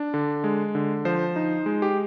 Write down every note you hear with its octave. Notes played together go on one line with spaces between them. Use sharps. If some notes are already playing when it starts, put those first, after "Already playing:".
Already playing: D4
D3
G#3
D3
F3 C5
D#4
G#3
G4